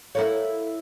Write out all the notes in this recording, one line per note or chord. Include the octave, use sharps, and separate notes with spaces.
E4 A4 A#4 C#5 F5